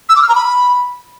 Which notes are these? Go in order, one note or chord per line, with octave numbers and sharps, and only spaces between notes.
E6
D6
F6
A#5
B5